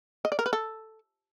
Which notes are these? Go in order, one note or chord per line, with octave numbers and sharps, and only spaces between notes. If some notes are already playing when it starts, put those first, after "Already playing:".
D#5
D5
A#4
B4
A4